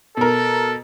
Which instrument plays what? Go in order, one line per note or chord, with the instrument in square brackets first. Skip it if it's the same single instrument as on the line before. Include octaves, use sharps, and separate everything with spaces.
[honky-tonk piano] B2 A#4 [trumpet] A4